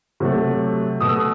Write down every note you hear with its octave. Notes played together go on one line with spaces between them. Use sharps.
C3 F#3 A3
B2 A3 D#6
E6
D#6